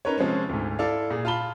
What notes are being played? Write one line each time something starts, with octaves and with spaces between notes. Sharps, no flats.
C#4 D#4 A#4 B4 C#5
C3 F3 G#3 C4 C#4
D2 G#2
E4 A4 D5 F5
A#2 G#4
F4 F5 A5 B5 G7